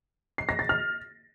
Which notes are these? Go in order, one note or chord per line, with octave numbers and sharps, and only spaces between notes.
C7
A#6
A6
F6